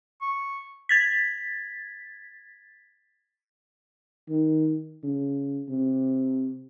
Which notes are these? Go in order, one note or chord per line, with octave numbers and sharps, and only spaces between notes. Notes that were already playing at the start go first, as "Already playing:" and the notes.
C#6
G#6 A6 B6
D#3
C#3
C3